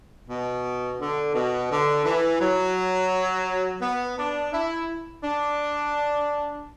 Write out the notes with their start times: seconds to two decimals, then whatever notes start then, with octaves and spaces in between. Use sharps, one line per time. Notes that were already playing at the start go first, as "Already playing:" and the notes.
0.29 B2
0.99 D3
1.34 B2
1.70 D3
2.05 E3
2.40 F#3
3.81 B3
4.17 D4
4.52 E4
5.23 D4